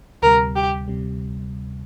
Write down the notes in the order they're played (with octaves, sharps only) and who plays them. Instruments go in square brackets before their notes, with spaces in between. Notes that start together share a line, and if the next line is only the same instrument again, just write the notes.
[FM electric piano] D2 C3 G3 [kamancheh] A#4
[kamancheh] G4
[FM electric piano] C3 G3